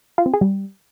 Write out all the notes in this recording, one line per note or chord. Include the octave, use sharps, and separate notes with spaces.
F4
C4
G#4
G3